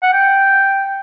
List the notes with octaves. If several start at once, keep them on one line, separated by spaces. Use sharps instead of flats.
F#5
G5